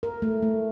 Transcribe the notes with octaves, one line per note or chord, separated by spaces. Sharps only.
A#4
A3
A3